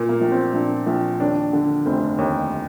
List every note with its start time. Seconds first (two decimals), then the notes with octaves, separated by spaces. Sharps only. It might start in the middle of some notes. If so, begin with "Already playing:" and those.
Already playing: A#2
0.09 A#3
0.21 A#1
0.32 C4
0.53 A#1 D4
0.86 A#1
1.20 D#2 D4
1.53 D3
1.86 F1 C4
2.18 D#2